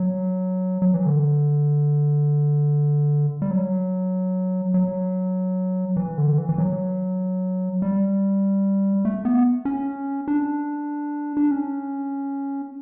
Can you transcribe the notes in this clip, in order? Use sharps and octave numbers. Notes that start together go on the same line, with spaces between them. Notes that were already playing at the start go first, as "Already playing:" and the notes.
Already playing: F#3
F#3
E3
D3
G3
F#3
F#3
E3
D3
E3
E3
F#3
G3
A3
B3
C#4
D4
D4
C#4